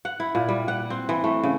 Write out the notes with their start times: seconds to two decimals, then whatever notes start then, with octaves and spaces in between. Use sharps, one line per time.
0.05 F#5
0.20 E4
0.35 A#2
0.49 G3
0.68 F#5
0.90 C4
1.09 E3
1.24 A3
1.43 C#3